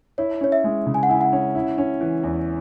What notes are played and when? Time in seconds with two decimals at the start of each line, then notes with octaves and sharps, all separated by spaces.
0.18 E4 C#5
0.41 C#4 C#5
0.52 E5
0.64 G#3
0.86 C#3
0.94 G#5
1.03 F#5
1.09 E4 G#5
1.21 F#5
1.32 C#4
1.55 E4
1.78 C#4
2.01 E3
2.23 E2